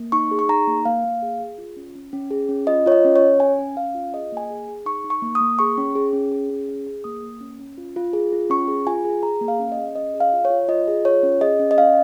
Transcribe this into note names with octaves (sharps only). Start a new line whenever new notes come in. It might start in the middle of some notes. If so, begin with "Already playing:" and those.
Already playing: A#3
D#4 C#6
G#4
C#6
D#4 A#5
A#3
A#3 F5
A#3
G#4
G#4
F4
C#4
C#4
C#4
G#4
C#4
F4 D#5
F4 C#5
D#5
C#4
C#5
C#4
C#4 G#5
C#4
C#4 F5
F4
G#4 D#5
A#3 G#5
G#4
G#4
D#4 C#6
D#4
C#6
A#3
D#6
A#3
G#4 C#6
C#4
G#4
C#4
G#4
C#4
G#4
G#4
A#3 D#6
A#3
C#4
C#4
F4
F4
G#4
F4
C#4 C#6
G#4
F4 G#5
G#4
G#4 A#5
A#3
F5
C#4
D#5
G#4
C#4 D#5
G#4
F5
F4
C#5
F4
F4 D#5
G#4
F4 C#5
C#4
G#4 D#5
C#4
D#5
C#4 F5